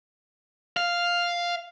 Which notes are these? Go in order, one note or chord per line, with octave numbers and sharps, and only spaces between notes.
F5